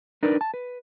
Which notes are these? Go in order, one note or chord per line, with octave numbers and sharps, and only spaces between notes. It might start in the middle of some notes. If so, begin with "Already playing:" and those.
D4 D#4 A#4 B4 D5
A5
B4